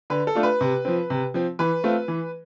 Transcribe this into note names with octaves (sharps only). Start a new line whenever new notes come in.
D3 B4
A4
A3 D4 F4
B4
C3
F3 C4
C3
F3 C4
E3 B4
A3 C4 F4
E3